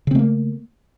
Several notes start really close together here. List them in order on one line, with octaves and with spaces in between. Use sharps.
C#3 C4 A3 A#3